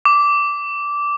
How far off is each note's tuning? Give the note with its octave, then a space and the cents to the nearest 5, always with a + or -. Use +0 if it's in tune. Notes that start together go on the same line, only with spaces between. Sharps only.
D6 -15